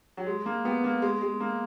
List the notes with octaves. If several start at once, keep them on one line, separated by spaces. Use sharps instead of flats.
F#3
G#3
A#3
B3
A#3
G#3
G#3
A#3